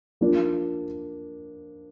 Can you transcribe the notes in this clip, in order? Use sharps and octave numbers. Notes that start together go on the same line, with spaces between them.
F3 A#3 D4